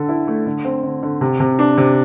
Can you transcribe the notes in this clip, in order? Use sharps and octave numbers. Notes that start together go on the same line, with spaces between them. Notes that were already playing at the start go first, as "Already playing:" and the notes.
Already playing: D3 A4
E4
A3
D3
C4
D3
D3
C3
C3
D4
C3